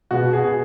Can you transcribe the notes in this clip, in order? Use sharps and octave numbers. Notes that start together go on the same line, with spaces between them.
B2 G#3 B3 F#4
G#4